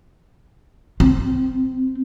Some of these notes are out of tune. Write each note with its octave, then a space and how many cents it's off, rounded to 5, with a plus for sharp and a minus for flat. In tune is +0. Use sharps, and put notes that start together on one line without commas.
C4 -15